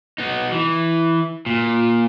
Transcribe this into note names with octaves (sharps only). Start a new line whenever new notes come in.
B3 D#4
E3
A#2